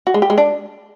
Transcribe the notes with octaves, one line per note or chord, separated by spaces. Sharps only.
F#4
G#3
G4
G#3
D4